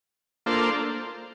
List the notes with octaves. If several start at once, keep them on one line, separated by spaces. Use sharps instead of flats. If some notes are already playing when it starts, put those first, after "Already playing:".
A#3 D4 F4 A4 C5